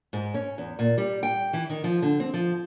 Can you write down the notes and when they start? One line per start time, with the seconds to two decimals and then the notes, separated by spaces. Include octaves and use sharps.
0.13 G#2
0.34 C#4
0.58 E2
0.79 A#2
0.98 G3
1.23 G5
1.53 E3
1.69 D#3
1.84 F3
2.02 D3
2.20 C4
2.34 F3